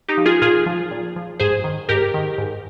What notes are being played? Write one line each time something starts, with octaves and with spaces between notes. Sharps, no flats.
D#4 G4
F3
F4 G#4
A#2 F4 G#4
F3
A#2
F3
G#2 G#4 C5
D#3
G#2 G4 A#4
D#3
G#2